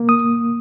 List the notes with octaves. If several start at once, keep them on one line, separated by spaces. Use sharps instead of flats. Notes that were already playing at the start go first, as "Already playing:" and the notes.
Already playing: A#3
D#6